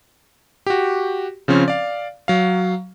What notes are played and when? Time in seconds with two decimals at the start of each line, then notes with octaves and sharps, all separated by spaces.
0.67 F#4 G4
1.48 C#3 F3 C4 C#4
1.68 D5 F5
2.28 F#3 F5